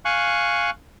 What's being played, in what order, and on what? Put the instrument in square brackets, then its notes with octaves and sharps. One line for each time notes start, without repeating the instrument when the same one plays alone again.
[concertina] F5 G#5 C#6 F#6